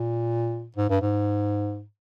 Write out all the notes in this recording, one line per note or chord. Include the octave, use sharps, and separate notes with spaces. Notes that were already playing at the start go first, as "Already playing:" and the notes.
Already playing: A#2
G#2
G2
G#2